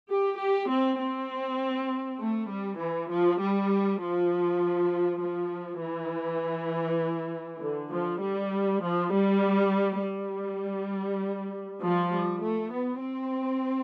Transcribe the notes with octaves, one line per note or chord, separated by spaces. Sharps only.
G4
G4
C4
C4
A3
G3
E3
F3
G3
F3
F3
E3
D3
F3
G3
F3
G3
G3
F3
G3
A3
B3
C4